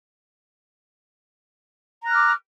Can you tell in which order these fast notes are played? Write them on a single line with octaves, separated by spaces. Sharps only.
A#5 F#6 F6 D6